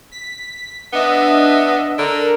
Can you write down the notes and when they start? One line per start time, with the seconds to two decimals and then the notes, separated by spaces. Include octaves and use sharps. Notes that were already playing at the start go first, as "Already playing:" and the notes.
0.11 B6
0.93 B3 D4 D#5 E5
1.98 D3 A#4